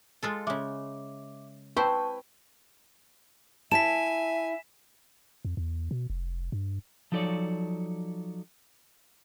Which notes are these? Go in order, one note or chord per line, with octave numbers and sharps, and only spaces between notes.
G#3 F4 A4
C#3 G#3 E5 D6
C4 E4 B4 C5 G5 A5 C#6
E4 E5 G#5 A5 B6 E7
F2
E2
B2
F1
G2
F3 F#3 D#4 A4 C#5 D5